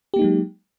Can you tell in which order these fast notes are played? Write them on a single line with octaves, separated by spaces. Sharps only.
G4 A#3 D#4 G#3 F#3